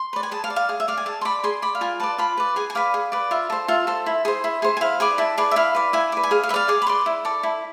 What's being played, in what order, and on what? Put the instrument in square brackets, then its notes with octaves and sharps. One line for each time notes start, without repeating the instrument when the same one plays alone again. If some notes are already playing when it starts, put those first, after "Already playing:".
Already playing: [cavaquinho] C6
B4 D5
G#5
G#4 A5
F5
D5
F5
G#4
E5
D5 F5
G#5
G#4 A5
C6
D5 B5
G#4 C6
D5 B5
F5
F4 G#5
B4 D5 A5
F4 B5
B4 D5
G#4 G#5
G#5
B4 D5 F5
G#4
B4 D5
F4 E5
A4 C5
F4 E5
A4 C5
E4
G#4 C5
E4
G#4 C5
G#5
E4 F5
G#4 B4 D5 G#5
E4 A5
G#4 B4 D5
E5
E4 F5
B4 D5
E4 G#5
B4 D5
G#5
G#4 F5
F5
B4 E5
D5 F5
G#4 D6
B5
B4 D5 C6
E4
A4 D5
E4